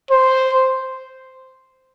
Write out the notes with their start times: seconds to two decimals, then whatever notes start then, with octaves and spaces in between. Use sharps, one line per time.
0.11 C5